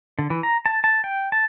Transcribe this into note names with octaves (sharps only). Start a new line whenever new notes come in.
D3
E3
A#5
A5
A5
G5
A5